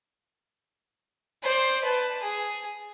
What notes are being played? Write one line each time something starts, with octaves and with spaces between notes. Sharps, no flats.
C5 D5
B4 A5
G#4